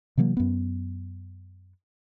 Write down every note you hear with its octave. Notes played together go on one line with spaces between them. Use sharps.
C3 E3 F#3 A#3
F#2 B3